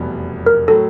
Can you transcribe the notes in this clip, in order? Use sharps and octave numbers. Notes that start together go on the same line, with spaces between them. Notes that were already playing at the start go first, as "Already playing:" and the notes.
Already playing: F1 E2 B2 G3 B3
A#4
A2 F#3 A4